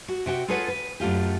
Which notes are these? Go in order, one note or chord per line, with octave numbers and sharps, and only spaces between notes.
F#4
C3 F#4 G5
F4 G#4 A4 B4 C#5 F#5
B4
F#2 A3 F4 G4